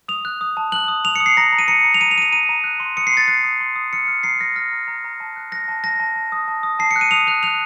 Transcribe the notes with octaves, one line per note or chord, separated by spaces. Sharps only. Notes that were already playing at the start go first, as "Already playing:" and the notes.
D#6 F7
F#6
D#6
A5
F#6 F#7
D#6
D#6 F7
D#6 C#7
C7
A#5 A#6
A#5
D#7
A#5 C#7
A#5
F7
A#5 D#7
F7
A#5 D#7
F7
A#5 D#7
A#5
F#6
C6
D#6 C#7
C7
C6 A6
F#6 C7
D#6
C6
D#6
F6 C#7
F6
A#5 C7
F6 A#6
F6 A#6
A#5
A#5
A#5
A5
F#6
F#6 A#6
A5
A5 A#6
A5
A5
D#6
A5
D#6
A5 C7
C#7
F#6
D#7
D#6 F7
F#6 F7
F#6 F7